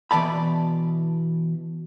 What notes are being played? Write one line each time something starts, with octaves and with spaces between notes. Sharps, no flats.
B2 E3 D5 A5 B5